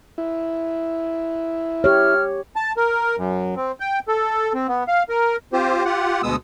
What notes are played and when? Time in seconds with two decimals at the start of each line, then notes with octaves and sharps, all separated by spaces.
0.18 E4
1.84 G4 C#5 F6
2.56 A5
2.77 A#4
3.17 F#2
3.56 C4
3.80 G5
4.08 A4
4.55 C4
4.69 B3
4.88 F5
5.09 A#4
5.53 C4 F4 G4 C5
5.85 F4 G4 F#5
6.23 D2 B2 G#3 B3 D#6 E6